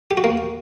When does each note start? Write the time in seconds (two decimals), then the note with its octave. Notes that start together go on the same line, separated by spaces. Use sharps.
0.11 G4
0.17 F#4
0.24 A#3